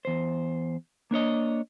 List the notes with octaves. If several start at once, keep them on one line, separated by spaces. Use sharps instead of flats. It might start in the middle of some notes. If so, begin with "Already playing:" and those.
E2 C5
A#3 D4 C#5 D#5